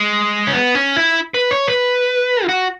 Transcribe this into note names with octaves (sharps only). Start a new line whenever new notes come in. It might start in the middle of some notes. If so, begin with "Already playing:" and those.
Already playing: G#3
C#4
B3
C#4
E4
B4
C#5
B4
E4
F#4